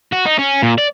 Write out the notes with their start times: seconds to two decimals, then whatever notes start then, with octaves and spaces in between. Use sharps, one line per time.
0.12 F#4
0.25 D#4
0.38 C#4
0.63 A#2
0.78 D5